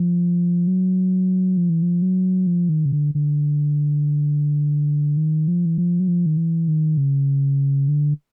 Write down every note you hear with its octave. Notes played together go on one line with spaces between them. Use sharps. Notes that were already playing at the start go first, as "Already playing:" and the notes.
Already playing: F3
F#3
F3
E3
F3
F#3
F3
D#3
C#3
D3
D3
D#3
F3
E3
F3
F#3
F3
D#3
E3
D#3
C#3
D3